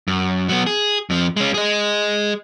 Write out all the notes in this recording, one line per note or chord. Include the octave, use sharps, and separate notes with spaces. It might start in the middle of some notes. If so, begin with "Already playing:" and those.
F#2
F#3 B3
G#4
F2 F3
G#3 C#4
G#4 D#5